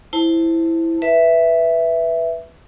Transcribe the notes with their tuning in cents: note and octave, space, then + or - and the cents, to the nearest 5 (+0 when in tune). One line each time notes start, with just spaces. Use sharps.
E4 +0 C5 +0 A5 +10
B4 +0 E5 +0